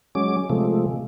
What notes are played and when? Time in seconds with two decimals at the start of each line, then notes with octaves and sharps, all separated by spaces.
0.15 F#3 G#3 C#4 D6
0.50 C3 F3 G#3 A3